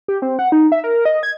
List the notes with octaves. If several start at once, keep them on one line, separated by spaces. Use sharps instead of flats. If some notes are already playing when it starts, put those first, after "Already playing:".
G4
C4
F#5
D#4
E5
A#4
D#5
G#6